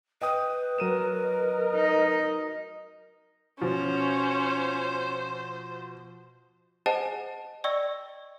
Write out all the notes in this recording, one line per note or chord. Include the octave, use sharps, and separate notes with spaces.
B4 D#5 G5 D#6
F#3 A#4 D#7 E7
A#4 D#5
D#4
B2 F3 C#4 C5
G#4 C5 D#5 F#5 G#5 A5
D5 D#5 G5 C#6 E6 A#6